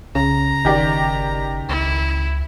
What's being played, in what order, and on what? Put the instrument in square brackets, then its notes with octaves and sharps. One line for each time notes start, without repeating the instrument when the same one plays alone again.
[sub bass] C2 [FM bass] C#3 [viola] A#5
[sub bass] G1 [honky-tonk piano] D#3 G4 D5
[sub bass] C#2 [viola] E4